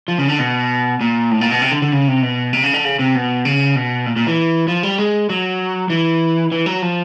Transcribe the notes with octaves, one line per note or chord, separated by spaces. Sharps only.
F3
C#3
D3
B2
A#2
A2
A#2
B2
C3
D3
D3
C#3
C3
B2
C3
C#3
D3
C#3
C3
B2
C#3
B2
A#2
A#2
E3
F3
G3
G#3
F#3
E3
E3
F#3
F3